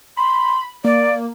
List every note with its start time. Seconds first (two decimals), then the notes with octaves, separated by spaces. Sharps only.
0.17 B5 C6
0.84 A#3 D5